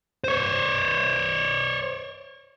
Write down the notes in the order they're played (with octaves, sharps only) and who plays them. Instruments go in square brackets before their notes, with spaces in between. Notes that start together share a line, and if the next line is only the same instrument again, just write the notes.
[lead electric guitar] C5 C#5